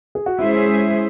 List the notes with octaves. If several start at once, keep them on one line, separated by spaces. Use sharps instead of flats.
G#4
F#4
G#3 C#4 E4 G#4 C5 E5